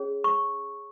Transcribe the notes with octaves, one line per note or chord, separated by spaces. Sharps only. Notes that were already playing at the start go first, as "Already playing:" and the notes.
Already playing: C#4 G#4 C#5
C#6